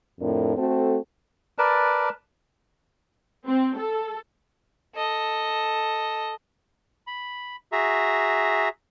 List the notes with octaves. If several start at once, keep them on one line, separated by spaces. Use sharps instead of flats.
F2 A2 D4 A#4
A3 C4 F#4 A4
A#4 B4 D5 A5
C4
A4
A4 D#5
B5
F#4 G#4 E5 A#5